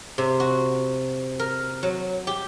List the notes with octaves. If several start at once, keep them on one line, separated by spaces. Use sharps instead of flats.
C3
F#4
A#4
F#3
G4